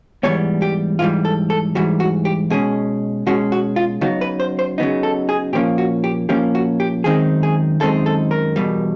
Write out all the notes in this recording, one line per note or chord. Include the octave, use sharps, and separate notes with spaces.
G#2 E3 G3 B3 C#5
G4
G#2 E3 G3 F4
A4
A4
G#2 E3 G3 F#4
F#4
G4
B2 G#3 C#4 G#4
B2 G#3 C#4 F#4
F#4
F4
C#3 F#3 B3 D#4 F#4
B4
C5
C5
C#3 F#3 B3 D#4
A4
G#4
A#2 F3 A#3 C#4 G4
F#4
G4
A#2 F3 A#3 C#4 G4
F#4
G4
F#2 D#3 G#3 C4 D#4 G#4
G#4
F#2 D#3 G#3 C4 D#4 A4
A4
A#4
E2 B2 G3